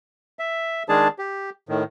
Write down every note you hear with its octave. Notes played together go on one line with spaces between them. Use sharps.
E5
D#3 G#3 D4 G#4 A5
G4
A2 D#3